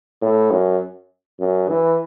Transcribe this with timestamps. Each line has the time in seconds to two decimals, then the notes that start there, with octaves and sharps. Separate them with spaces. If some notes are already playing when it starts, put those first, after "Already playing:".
0.22 A2
0.51 F#2
1.40 F#2
1.69 E3